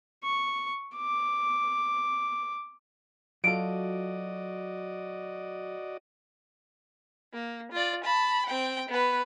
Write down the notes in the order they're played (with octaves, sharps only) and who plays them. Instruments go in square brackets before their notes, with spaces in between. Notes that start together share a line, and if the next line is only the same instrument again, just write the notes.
[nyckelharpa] C#6
D6
[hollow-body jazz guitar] F#3 F4 A4 [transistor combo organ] F#4 D5 D#5 [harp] D7
[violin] A#3
F4 D5
A5 B5
C4 G5
B3 B4